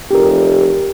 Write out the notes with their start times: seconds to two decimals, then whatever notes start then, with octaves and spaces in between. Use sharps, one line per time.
0.11 F1 G4 A#4